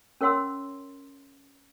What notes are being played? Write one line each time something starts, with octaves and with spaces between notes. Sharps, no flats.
C#4 A#4 C#5 F#5 C6 E6